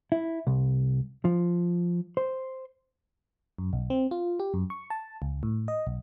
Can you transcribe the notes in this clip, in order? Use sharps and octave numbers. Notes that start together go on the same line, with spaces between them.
E4
C2
F3
C5
F#2
B1
C4
F4
G4
F#2
C#6
A5
C#2
A2
D#5
B1